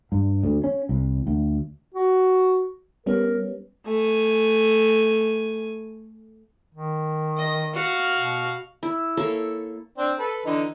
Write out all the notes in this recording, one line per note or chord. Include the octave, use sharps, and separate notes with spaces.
G2
D2
C#4
C2
D2
F#4
G3 B3 C#4 A#4
A3 G#5
D#3
D#5
F#4 F5
B2
E4
A#3 A4 C#5 B5
C4 D4
A4 B4
D3 E3 D#4